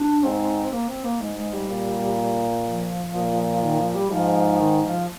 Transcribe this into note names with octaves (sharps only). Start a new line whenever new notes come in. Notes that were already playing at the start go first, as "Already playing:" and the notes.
Already playing: D4
G#2 C4
A#3
C4
A#3
G#2 G#3
G#3
G3
A#2
F3
A#2
D#3
F3
G3
G#2 F3
D#3
F3